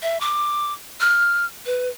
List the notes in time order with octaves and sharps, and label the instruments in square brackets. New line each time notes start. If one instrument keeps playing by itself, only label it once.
[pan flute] E5
D6
F6
B4